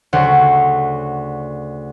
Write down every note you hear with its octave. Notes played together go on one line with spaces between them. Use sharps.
D2 C#3 C5 F#5